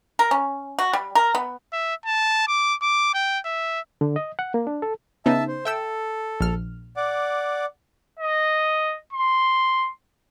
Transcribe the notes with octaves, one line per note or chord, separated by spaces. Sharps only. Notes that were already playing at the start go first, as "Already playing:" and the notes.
A#4
C#4
F#4
G3
A#4
B3
E5
A5
D6
D6
G5
E5
D3
D#5
F#5
A#3
D4
A4
C#3 B3 D#4 E5 A5
C5
A4 E5 G5 E6
A#1 F6
D5 F#5 D6
D#5
C6